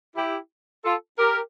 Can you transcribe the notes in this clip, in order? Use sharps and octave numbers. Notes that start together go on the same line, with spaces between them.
E4 G4
F4 A4
G4 A#4